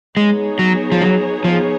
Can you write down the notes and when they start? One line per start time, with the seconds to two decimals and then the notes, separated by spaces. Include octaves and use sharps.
0.17 G#3 B3 D#4 G#4 C#5
0.59 F#3
0.92 F3
1.02 F#3
1.44 F3